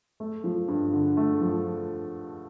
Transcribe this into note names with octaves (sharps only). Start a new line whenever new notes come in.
A3
F3
G2
D3
A3
F3